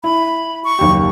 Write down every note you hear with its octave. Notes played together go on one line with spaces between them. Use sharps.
E4 B5
C#6
F#1 D#2 G4